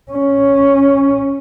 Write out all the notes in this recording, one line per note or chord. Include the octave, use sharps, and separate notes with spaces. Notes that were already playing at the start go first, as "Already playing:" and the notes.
C#4